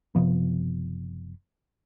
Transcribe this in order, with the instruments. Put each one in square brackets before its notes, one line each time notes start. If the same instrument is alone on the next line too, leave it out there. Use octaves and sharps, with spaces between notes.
[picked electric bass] F#1 C3 F3 B3